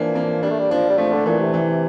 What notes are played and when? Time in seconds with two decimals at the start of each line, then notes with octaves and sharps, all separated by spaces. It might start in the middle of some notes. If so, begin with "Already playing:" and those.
Already playing: E3 F3 A#3 D4
0.15 A#3
0.43 G3 D4
0.51 A3
0.59 G3
0.71 F3 D4
0.90 G3
0.98 F3 A3
1.12 D3
1.26 A#2 E3
1.40 C3
1.54 E3